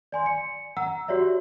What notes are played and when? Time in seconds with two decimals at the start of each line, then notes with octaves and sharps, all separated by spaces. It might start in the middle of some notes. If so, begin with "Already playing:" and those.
0.12 D5 G#5 C6
0.26 C#7
0.77 F#5 A#5 E6
1.08 F#4 G4 C#5 D5 E5